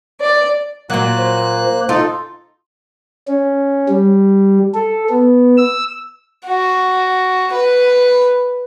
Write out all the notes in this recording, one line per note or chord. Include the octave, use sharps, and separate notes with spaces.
D5
A#2 F#3 A#3 F#6
C5
D#4 F4 A4
C#4
G3
A4
B3
E6
F#4
B4